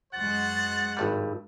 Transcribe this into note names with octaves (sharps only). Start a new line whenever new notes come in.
F#2 G#3 F#4 C5 F#5 A6
G#1 G2 G3